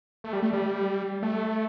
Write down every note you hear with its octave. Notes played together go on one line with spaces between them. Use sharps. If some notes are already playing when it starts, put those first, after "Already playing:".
A3
G3
A3
G3
A3